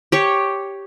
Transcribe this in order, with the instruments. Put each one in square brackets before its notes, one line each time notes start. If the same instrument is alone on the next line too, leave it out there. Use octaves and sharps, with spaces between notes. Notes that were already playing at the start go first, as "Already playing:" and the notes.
[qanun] G4 C#5 C#6